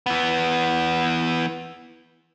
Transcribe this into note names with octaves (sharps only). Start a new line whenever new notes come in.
E3 B3